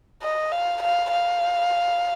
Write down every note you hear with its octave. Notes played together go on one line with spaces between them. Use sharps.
D#5
F5
F5
F5